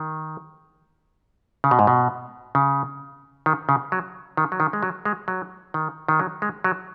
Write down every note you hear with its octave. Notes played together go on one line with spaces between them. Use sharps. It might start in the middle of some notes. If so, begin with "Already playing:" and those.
Already playing: D#3
C#3
B2
G#2
B2
C#3
D#3
C#3
F#3
D#3
F#3
D#3
G#3
F#3
G#3
F#3
D#3
D#3
F#3
G#3
F#3